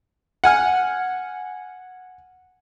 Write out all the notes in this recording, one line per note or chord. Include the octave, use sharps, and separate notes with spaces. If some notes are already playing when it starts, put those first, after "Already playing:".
F#5 G#5 F6